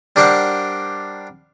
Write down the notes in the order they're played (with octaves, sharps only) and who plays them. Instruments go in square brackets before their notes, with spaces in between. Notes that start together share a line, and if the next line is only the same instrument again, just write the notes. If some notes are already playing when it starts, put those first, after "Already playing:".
[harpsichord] G3 D4 A#4 C5 D5 F#5